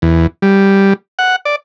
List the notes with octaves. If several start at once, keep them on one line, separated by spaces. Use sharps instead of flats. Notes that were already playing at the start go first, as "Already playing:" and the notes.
E2
G3
F#5
D5